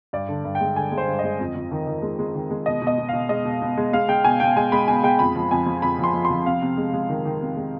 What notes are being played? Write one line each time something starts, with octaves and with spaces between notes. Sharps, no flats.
G2 D5
D3
G2
G5
G#3
D3 G#5
G#3
C5
G2
G#3 D#5
F2
F2
D#3
D#3
G#3
G#3
D#3
G#3
B2 D#5
B2
D#5
B2
B2 F5
G#3 D#5
B2
B2
G#3
G#3 F5
G#3 G5
B2 G#5
B2 G5
G#3 G#5
G#3 B5
B2 G#5
G#3 G5
F2 B5
F3
F2 G#5
F3
F2 B5
F3 C6
F3
C6
F3
C3 F5
C3
G#3
G#3
D#3
D#3
C3
G#3